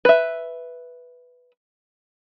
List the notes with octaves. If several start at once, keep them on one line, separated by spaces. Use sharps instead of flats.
B4 E5